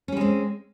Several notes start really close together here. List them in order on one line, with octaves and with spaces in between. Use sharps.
C#4 G3 G#3 C4